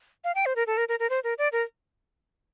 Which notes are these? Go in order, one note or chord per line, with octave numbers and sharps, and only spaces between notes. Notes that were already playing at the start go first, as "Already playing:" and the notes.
F5
G5
C5
A#4
A4
A#4
A#4
A#4
C5
A#4
D5
A#4